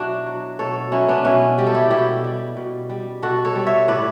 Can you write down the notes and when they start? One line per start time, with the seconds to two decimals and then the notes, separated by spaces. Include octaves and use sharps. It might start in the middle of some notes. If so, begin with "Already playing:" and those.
Already playing: B2 F#3 D4 E4 F#4
0.26 F#3
0.59 B2 A4 C#5
0.92 F#3 C#4 E4
1.08 B3 D4
1.24 B2 C#4 E4
1.58 G3 G4
1.67 A4
1.75 E4 G4
1.90 B2 E4 G4
2.24 G3
2.57 B2
2.90 G3
3.22 B2 F#4 A4
3.45 A4 C#5
3.55 G3
3.66 C#5 E5
3.88 A2 B4 D5